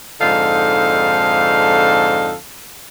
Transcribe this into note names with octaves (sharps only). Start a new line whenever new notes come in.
F2 G#2 D3 D#4 A4 F5